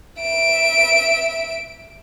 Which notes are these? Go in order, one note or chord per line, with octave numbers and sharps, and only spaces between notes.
E5 D7